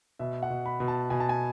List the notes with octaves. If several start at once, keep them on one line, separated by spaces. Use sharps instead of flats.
B2 E5
F#5
B2
B5
B2
A5
B2 G#5
A5
G#5